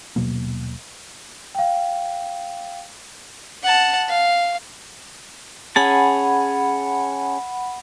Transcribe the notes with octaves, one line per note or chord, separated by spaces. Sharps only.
D#1 B2 F#3 A#3
F5 G5
F#5 A5
F5
C#4 G#4 F#5 A5 B5